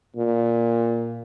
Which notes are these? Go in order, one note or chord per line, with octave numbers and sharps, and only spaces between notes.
A#2